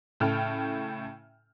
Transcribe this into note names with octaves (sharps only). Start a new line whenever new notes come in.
A2 C#3 A4 G5 F6